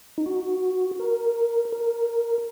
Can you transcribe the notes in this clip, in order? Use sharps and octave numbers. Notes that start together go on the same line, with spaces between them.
D#4
F#4
A#4
A#4